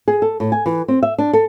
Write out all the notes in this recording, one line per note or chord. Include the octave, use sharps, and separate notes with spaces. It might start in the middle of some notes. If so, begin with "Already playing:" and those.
G#4
A4
A2
G#5
E3
C4
E5
D4
A4